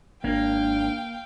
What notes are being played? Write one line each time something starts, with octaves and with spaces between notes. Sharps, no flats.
G#1 A#3 D4 F5 G5